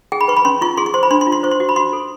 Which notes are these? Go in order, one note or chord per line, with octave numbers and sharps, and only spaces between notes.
G#4 G5
B5
B4 C#6
B5
C#4 C6
F4 C#6
G#4 C6
C#6
C5 C6
B5
D4 C6
C6
F4
C6
C5 C#6
C6
F#4
B5
F#4 C6
A4